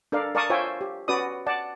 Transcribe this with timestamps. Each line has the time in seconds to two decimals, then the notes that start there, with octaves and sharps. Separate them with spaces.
0.12 D4 A4 A#4 D5 F5
0.35 A#4 D5 F5 A5 C#6 D#6
0.50 F4 C5 C#5 E5 G5 G#5
0.81 G4
1.08 C#4 F#4 B4 D5 D#6
1.46 D5 F#5 A5